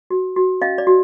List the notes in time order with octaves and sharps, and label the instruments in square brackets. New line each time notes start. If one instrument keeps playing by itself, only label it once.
[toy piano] F#4
F#4
C#4 D#5 F5
D5
F#4